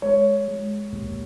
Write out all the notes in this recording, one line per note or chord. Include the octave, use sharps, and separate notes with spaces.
G#3 C#5
G#3
D#2